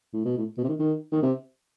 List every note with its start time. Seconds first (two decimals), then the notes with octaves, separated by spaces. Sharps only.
0.14 A2
0.25 B2
0.37 A2
0.58 B2
0.64 C3
0.68 D#3
0.79 D#3
1.12 D#3
1.23 C3